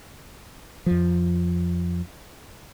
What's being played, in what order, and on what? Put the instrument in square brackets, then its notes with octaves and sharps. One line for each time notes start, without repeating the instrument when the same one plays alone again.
[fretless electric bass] F2 F3